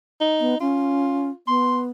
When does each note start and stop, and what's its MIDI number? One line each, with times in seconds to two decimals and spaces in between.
0.21 0.57 63
0.40 0.55 59
0.61 1.31 61
0.61 1.37 65
1.47 1.91 59
1.47 1.79 84